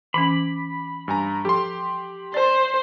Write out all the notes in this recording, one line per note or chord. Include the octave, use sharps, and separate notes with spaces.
E3 C#4 B5 D6
G2 G#5 A#5
F3 G4 A4 C6
C5 D5